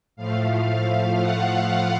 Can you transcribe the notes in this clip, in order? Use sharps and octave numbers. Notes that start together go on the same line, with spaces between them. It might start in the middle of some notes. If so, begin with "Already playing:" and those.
A2 F3 A3 F5
F5
F#5